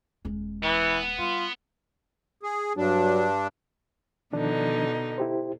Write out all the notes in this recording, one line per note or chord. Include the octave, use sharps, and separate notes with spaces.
D#1 G#3
E3 B3
G3 F4
G#4
G2 F#3 D4
B2 D3 D#3 F3 D4 D#4
E4 G4 C5